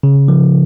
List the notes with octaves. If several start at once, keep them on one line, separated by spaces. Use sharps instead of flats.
C#3
F3